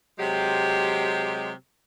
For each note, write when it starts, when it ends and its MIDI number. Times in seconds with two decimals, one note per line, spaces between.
0.19 1.51 48
0.19 1.51 54
0.19 1.51 56
0.19 1.51 67